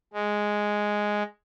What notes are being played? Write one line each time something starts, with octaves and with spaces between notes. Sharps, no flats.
G#3